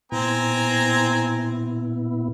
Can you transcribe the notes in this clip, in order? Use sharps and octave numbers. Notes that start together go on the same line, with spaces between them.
A#2 B3 C4 E4 G#5 A#5